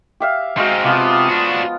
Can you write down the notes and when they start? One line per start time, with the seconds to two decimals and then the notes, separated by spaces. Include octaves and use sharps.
0.20 G4 E5 F5
0.57 G#3 C4 D#4 F#4 F5
0.85 C3 F3 B3 F4
1.29 D4 F#4